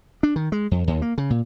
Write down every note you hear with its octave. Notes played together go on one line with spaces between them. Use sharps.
D4
D#3
G#3
F2
D#2
A#3
C#3
A#2